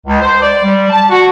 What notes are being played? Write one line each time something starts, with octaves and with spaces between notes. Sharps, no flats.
C#2
C5
D5
G3
A5
F#4